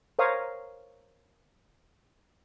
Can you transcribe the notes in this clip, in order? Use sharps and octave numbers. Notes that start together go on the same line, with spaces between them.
A#4 C5 C#5 F5 D#6